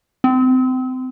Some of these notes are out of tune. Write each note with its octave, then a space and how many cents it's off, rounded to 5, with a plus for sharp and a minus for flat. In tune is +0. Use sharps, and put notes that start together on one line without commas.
C4 -30